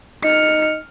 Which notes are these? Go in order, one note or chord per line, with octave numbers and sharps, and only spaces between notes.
D#4 F6 C#7